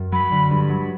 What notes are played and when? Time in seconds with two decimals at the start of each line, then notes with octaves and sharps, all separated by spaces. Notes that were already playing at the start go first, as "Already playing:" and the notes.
Already playing: F#2
0.12 F#3 B5
0.32 D3
0.51 G2
0.70 F#3